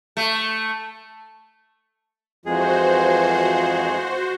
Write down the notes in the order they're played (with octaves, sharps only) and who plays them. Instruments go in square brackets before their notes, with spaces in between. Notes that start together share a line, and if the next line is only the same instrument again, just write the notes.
[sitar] A3
[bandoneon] F2 G#3 G#4 [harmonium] E3 F3 F4 [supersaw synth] F#4 C5